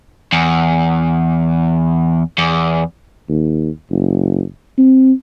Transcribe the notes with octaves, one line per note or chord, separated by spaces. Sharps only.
E2
E2
D#2
F#1
C4